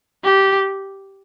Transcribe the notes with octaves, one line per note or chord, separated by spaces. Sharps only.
G4